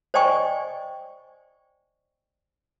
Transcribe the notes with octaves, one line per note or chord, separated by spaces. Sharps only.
C5 D5 D#5 G5 G#5 C#6